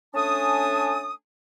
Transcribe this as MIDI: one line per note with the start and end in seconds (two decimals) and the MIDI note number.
0.14 1.11 57
0.14 1.11 61
0.14 1.11 62
0.14 1.11 80
0.14 1.11 81
0.14 1.11 87